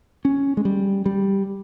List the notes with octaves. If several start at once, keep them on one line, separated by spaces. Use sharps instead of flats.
C#4
G#3
G3
G3